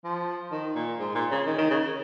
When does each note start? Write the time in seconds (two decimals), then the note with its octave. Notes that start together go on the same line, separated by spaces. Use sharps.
0.04 F3
0.52 D#3
0.75 A#2
0.99 G#2
1.15 A#2
1.31 C#3
1.47 D#3
1.58 D#3
1.71 C#3